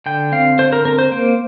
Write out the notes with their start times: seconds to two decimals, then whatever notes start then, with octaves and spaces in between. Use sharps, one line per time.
0.06 D3 G5
0.32 C4 F5
0.58 D3 C5
0.73 A#4
0.85 C4 A#4
0.99 C5
1.12 A#3